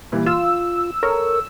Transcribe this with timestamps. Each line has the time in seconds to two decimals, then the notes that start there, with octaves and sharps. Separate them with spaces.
0.12 A#2 E3 G3
0.26 F4 E6 E7
1.03 A4 A#4 C#5 C#6